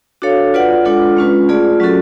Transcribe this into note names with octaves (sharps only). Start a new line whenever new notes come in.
D4 F#4 A4 C#5 F5
F4 B4 D5 F#5
G#3 D4 F4 A4
G#3 C#4 F4 B4
A3 F4 G#4 D5
F#3 C#4 F#4 A4